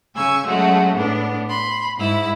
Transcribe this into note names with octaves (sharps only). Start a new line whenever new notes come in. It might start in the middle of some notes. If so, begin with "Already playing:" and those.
C#3 G#5 C#6 E6 G#6
F#3 G#3 A3 C#4 F#4
A2 B3 D4
B5 C6
G#2 E4 E6